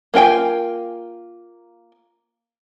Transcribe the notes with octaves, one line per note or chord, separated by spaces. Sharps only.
A#3 F4 G#4 G5 G#5